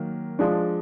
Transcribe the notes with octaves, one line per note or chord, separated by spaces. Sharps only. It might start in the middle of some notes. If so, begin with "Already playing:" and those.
Already playing: D#3 F#3 A#3
F3 G#3 D4